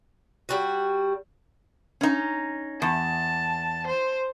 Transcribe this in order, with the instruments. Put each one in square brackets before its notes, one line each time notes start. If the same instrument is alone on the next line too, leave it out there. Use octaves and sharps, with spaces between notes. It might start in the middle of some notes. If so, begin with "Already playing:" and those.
[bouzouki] G3 F#4
[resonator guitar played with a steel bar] C#4 D#4
[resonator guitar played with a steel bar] E2 [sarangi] A5
[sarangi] C5